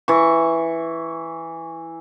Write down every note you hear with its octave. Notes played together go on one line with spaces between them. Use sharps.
E3 C#6